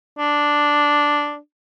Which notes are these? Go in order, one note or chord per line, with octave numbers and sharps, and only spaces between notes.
D4